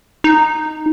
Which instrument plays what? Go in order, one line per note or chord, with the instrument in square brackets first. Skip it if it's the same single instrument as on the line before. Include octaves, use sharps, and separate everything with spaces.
[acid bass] D#4